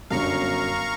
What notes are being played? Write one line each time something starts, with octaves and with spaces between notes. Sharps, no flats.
G1 F#2 F5 A#5 C#6